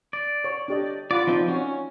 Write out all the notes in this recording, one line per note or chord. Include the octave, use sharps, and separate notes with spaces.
D5
C#5
D4 G4 D#5
F4 D5 F#5 B5
F3 C4 D#4 D5
C#4 F#4 C#5